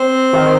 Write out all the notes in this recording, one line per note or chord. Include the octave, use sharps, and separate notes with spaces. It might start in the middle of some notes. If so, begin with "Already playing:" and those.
Already playing: C4
D#3